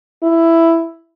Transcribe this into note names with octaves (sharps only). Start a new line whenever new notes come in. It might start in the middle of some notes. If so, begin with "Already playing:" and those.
E4